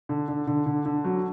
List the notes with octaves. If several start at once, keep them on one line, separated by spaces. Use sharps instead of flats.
D3
D3
D3
D3
D3
F#3